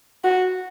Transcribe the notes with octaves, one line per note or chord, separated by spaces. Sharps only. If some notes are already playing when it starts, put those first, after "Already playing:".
F#4